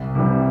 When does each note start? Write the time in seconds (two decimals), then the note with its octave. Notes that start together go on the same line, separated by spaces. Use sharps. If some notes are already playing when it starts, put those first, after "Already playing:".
Already playing: C2
0.15 C3 E3 G3